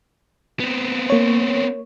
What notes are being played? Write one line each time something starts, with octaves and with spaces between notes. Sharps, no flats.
B3 C4
A#3 C#5